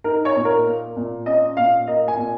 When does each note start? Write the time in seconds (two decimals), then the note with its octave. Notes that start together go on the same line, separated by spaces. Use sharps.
0.04 D#4 A#4
0.25 C#5
0.36 A#2
0.45 A#4
0.66 A#3
0.96 A#2
1.26 C#4 D#5
1.57 A#2 F5
1.87 A#3 D#5
2.08 G#5
2.17 A#2